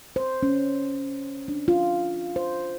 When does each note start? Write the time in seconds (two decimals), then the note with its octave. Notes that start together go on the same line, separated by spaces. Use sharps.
0.16 C5
0.43 C#4
1.48 D4
1.68 F4
2.36 C5